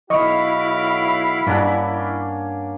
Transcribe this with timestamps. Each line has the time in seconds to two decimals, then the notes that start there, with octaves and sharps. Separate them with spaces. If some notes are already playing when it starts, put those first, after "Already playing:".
0.10 B1 E4 F#4 D#5 F5 C#6
1.47 G2 A#3 C#4 D4 F#5